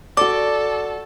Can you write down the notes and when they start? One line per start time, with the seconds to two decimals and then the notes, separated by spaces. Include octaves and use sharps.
0.17 F#4 A4 D5 D6